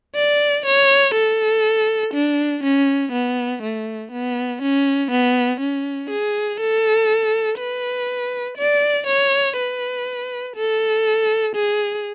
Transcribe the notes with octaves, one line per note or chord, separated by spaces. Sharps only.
D5
C#5
A4
D4
C#4
B3
A3
B3
C#4
B3
C#4
G#4
A4
B4
D5
C#5
B4
A4
G#4